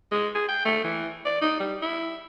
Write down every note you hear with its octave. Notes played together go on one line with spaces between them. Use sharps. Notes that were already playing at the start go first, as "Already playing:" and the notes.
G#3
G#4
G5
A3
E3
D5
D#4
G3
E4